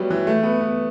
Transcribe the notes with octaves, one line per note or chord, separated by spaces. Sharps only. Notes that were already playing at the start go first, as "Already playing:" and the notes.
Already playing: F#3 G3 A3 B3
E3
A3
B3
B3